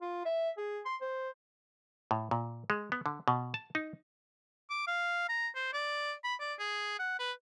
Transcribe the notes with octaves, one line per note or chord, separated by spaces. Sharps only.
F4
E5
G#4
C6
C5
A2
A#2
G#3
B3
D3
B2
A5
D#4
D6
F5
A#5
C5
D5
B5
D5
G#4
F#5
B4